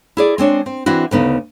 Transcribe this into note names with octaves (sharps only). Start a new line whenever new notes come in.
E4 G#4 D5
G#3 C4 D4 C#5
C4
E3 C4 D4 E4 F#4
D2 C#3 B3 D#4